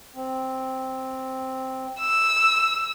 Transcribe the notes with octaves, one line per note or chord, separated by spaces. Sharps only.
C4
E6